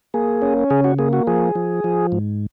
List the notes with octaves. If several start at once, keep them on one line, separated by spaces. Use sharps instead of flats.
A#3 G#4
C#4
C#3 G#4
F#4
A#3 G#4
F#4
F3 G#4
F3
F3
G#2